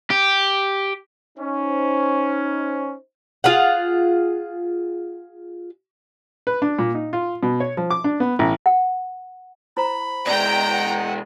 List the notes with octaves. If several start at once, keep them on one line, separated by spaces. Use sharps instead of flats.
G4
C#4 D#4 C5
F4 G#4 F#5
B4
D4
A#2
D#4
F4
B2
C#5
F3
D6
D4
B3
A1
F#5
E4 C5 A#5 B5
B2 G#3 D5 G5 A#5
F#5